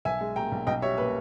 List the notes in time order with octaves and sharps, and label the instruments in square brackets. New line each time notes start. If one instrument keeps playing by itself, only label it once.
[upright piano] B1 E5 G#5
G#3
A#2 G5 A#5
B1
B1 D#5 G5
G3 C#5 E5
A#2 B4